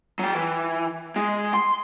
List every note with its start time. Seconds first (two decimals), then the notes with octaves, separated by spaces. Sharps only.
0.19 F#3 G5
0.35 E3
1.16 G#3
1.54 C6